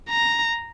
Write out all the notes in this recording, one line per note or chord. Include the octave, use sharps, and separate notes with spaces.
A#5